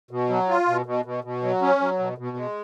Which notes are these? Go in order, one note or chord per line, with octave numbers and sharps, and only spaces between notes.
B2
F#3
F4
B2
B2
B2
B2
F#3
C#4
F#3
B2
B2
G#3